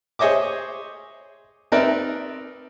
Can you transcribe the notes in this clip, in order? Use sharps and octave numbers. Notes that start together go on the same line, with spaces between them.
G#4 C5 C#5 D#5 E5 D6
C4 D#4 A#4 B4 D5 E5